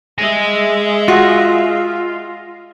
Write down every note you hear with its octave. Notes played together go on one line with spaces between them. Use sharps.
G#3 D#5 E5 G#5
F4 F#4